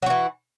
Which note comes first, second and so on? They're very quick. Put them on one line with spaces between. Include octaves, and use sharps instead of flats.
F#3 F#4 E3